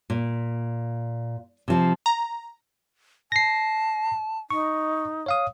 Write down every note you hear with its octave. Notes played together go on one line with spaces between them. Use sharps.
A#2
C3 F3
A#5
A5 A#6 C7
D#4 C#6
C#5 F5 D#6